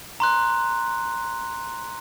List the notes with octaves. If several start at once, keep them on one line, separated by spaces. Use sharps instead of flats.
A#5 C6 F#6